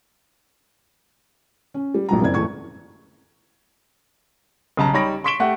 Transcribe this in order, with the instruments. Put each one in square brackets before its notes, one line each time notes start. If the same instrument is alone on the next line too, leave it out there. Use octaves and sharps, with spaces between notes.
[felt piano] C#4
G3
A#1 F#3 A#5
F#1 C4 E4 D5 G#6
E2 A2 A3 C#6 G#6
[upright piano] B1 C#3 A5 A#5
G3 D#4 C#5 B5 A#6 D7
C6 C#6 B6 D7 E7 G7
A3 G4 F#5